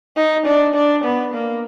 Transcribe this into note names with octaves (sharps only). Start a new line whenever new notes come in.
D#4
D4
D4
B3
A#3